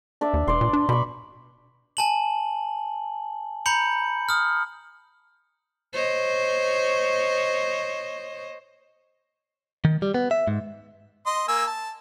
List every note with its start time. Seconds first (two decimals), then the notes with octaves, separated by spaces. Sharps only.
0.21 D4 D5 E5
0.34 D#2
0.48 E1 D5 C6
0.61 A#2
0.73 D4
0.89 B2 B5 C#6
1.97 G#5 A5 F#7
3.66 A#5 B5 G6 C#7 F#7
4.29 D#6 F6
5.93 C5 C#5 D#5
9.85 D#3
10.02 G3
10.14 B3
10.31 E5
10.47 G#2
11.26 D#5 C6
11.48 A#3 G#5 E6
11.67 A5